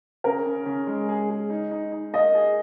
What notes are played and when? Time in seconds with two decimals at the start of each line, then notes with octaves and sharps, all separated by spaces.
0.24 C#3 A#4
0.46 C#3
0.66 C#3
0.87 G#3
1.09 G#4
1.30 G#4
1.50 D#4
1.71 D#4
1.92 D#4
2.13 A#3 D#5
2.35 G#4